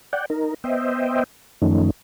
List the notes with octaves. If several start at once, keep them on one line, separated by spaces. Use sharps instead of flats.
D5 F#5 G5
D#4 A#4
B3 C5 D#5 E5 G5
F#2 D#3 F3 A3 C#4 D#4